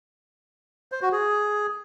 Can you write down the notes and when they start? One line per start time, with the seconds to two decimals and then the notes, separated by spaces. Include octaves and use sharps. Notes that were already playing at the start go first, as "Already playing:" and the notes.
0.92 C5
1.02 F#4
1.12 G#4